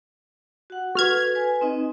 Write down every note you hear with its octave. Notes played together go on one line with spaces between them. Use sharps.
F#4 F#5
F#4 A4 B4 F6 G#6
B4 G#5
C4 D#4 D#5